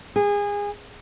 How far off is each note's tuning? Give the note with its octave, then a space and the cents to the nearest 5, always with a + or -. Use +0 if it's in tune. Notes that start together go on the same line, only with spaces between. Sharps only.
G#4 -25